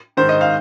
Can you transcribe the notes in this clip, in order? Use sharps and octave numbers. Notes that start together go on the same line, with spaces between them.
G#2 D#3 C5
D#5
F5